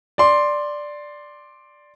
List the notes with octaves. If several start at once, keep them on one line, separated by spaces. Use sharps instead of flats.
D5 C6